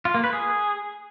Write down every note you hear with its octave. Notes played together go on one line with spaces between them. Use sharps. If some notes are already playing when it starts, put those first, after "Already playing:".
F4
A#3
B4
G#4